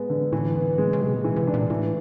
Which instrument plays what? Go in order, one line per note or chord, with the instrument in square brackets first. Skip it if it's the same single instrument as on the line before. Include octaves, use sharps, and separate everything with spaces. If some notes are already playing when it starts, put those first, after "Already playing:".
Already playing: [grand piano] G#3 B3
D3
[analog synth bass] A2 [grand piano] E3
[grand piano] B3
G#3
[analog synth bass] C#3
[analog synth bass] C3 [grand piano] G#3
[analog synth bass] B2
A#2
[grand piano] E3
[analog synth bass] C3
[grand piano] D4
[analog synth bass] A#2
[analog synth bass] A2 [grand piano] E3